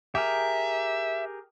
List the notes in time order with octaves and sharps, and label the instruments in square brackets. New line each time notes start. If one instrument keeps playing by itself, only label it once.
[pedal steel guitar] G4 G#4 A#4 [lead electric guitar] E5